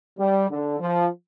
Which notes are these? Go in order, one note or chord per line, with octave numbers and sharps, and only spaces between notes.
G3
D3
F3